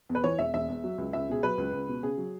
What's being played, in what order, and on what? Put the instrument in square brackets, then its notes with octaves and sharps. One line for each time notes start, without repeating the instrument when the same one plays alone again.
[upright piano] E2
B4
E3 C#5
E1 E5
E1 E5
E2
F#3
C#2
C#2 E5
B2 G#4
F#3 B4
C#2
C#2
B2
C#3 G#4
F#3